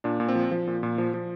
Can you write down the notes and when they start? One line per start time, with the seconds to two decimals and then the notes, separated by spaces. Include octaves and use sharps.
0.04 A#2 D4
0.20 A#2
0.28 C4
0.35 F3
0.51 F3
0.67 A#2
0.83 A#2
0.98 F3
1.14 F3